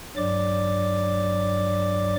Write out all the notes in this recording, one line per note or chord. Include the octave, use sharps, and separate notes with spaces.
G2 F#3 D5 D6